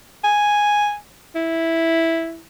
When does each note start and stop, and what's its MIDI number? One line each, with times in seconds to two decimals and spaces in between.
0.24 0.96 80
1.35 2.40 64